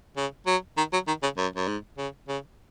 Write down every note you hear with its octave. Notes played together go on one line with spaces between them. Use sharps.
C#3
F#3
D#3
F#3
D#3
C#3
F#2
F#2
G#2
C#3
C#3